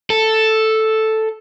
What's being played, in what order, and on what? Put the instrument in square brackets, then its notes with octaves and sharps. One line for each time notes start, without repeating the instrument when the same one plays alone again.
[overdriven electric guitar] A4